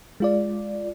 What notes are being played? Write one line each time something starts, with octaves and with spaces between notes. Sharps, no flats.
G#3 F4 D5